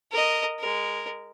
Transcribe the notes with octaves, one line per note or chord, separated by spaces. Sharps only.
A#4 D#5
G#3 A#4